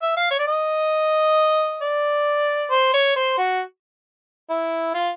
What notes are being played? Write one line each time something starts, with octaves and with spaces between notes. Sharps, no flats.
E5
F5
C#5
D5
D#5
D5
C5
C#5
C5
F#4
E4
F4